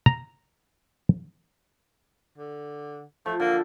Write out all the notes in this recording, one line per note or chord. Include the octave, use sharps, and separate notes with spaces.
A#5
D3
F3 A3
D3 A#3